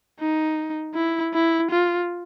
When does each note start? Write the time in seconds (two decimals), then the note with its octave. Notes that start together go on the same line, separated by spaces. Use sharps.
0.20 D#4
0.95 E4
1.34 E4
1.71 F4